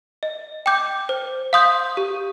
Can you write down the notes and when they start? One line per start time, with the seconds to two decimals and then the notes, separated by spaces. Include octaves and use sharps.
0.23 D#5
0.66 G5 D6 G6
1.09 C5
1.53 F5 C6 D#6 G6
1.97 G4